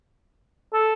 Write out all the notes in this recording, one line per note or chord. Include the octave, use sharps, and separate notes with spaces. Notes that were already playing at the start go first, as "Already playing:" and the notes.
A4